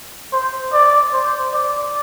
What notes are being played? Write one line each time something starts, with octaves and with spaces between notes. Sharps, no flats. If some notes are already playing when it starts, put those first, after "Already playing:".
C5
D5
C5
D5